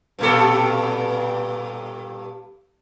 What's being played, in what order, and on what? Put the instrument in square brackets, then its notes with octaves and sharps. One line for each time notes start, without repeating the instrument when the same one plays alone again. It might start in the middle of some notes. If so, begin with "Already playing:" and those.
[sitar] G2 A#2 A4